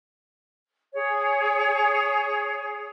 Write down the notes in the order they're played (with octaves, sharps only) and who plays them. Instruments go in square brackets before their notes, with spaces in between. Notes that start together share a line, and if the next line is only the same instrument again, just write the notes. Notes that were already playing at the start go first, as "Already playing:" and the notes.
[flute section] G#4 C#5